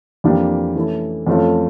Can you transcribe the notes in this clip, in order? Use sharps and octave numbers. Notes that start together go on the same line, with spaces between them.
F2 E3 A#3 D4 G4
E3 A3 C#4 E4
F2 E3 A3 C#4 F4